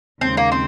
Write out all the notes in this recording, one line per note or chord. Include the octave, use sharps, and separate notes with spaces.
D#2 C#3 G#3 C4
A#3
C4